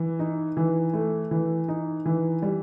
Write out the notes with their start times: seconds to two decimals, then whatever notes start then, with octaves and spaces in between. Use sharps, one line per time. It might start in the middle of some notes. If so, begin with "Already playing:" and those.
Already playing: E3
0.19 D#4
0.57 E3
0.93 A3
1.31 E3
1.68 D#4
2.06 E3
2.42 G3